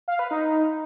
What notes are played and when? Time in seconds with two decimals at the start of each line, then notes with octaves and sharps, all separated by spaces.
0.08 F5
0.19 B4
0.31 D#4